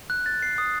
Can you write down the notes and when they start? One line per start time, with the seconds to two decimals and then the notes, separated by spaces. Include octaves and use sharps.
0.10 F#6
0.26 A6
0.42 C7
0.58 D#6